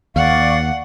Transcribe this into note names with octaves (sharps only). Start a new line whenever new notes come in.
D#2 D5 F5 F#5 C#6